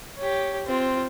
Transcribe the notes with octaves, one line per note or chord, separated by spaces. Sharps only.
G4 C#5
C4 F4